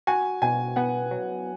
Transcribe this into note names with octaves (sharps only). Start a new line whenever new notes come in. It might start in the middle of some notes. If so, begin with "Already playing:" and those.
F#4 G#5
B2 G#5
B3 F#5
F#3